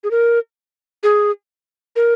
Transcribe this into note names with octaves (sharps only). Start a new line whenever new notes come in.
G#4
A#4
G#4
A#4